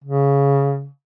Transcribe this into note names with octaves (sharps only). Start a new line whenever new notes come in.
C#3